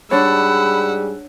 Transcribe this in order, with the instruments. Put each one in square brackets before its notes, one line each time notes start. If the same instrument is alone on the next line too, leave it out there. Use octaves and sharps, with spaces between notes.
[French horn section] G#2 G3 G#4 [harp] D4 C#5 [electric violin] F#5 E6 [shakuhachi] B5